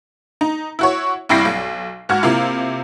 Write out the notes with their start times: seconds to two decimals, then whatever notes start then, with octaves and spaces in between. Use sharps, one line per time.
0.41 D#4
0.79 E4 F#4 C#5
1.29 C2 G2 E4 G5 A#6 C7
1.45 B1
2.09 G#2 F#4 F6 G#6
2.23 C3 A#3 E4 F4